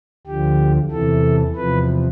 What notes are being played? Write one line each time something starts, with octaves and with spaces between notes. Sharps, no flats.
D2 D3 F3 G4
E2 C3 E3 A4
E2 C3 F3 B4